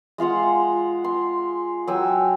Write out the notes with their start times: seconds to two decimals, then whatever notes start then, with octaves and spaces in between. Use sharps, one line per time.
0.18 G#3 F4 F5 F#5
1.04 C6
1.87 F#3 G5 G#5 E6